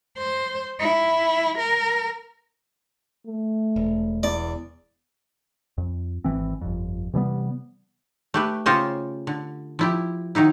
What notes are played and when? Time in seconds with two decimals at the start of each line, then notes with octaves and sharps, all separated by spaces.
0.18 C5
0.79 E4
1.58 A#4
3.27 A3
3.76 E1
4.23 E2 D5
5.78 F2
6.24 G#1 E3 C4
6.61 G1 F2
7.14 C3 E3 G3 B3
8.34 A3 G4 B4
8.66 C#3 F4 G4 C5 C#5 D#5
9.27 D3
9.79 F3 E4 G4
10.35 D#3 F#3 D#4 E4